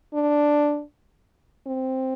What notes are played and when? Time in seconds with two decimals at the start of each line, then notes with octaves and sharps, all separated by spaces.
0.14 D4
1.67 C4